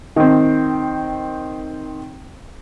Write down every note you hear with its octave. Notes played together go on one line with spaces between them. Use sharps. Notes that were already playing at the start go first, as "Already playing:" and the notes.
D#3 C4